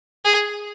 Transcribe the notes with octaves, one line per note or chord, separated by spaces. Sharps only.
G#4